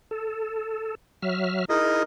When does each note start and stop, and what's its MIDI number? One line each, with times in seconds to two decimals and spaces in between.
0.11 0.95 69
1.22 1.65 54
1.22 1.65 76
1.22 1.65 89
1.69 2.03 63
1.69 2.03 64
1.69 2.03 68
1.69 2.03 70
1.69 2.03 75